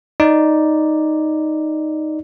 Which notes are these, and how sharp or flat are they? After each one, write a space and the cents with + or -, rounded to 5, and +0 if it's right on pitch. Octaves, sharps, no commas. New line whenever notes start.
D#4 +0 D5 +0